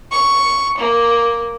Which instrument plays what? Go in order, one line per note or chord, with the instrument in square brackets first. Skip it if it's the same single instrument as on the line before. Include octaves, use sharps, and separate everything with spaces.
[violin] C#6
A#3